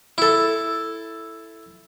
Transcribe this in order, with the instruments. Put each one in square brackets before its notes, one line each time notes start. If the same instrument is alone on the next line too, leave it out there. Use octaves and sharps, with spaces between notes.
[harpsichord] E4 A4